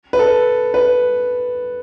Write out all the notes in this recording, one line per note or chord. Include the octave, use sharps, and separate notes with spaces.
B4
A4
B4